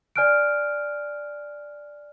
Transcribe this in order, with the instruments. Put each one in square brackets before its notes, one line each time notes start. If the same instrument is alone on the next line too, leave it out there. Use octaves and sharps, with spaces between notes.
[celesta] D5 G#5 F6 F#6 D7